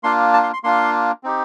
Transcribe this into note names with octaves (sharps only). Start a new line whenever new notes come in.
A#3 D4 F4 C6
A5
C6
C6
A#3 D4 F4 C6
C4 D#4 G4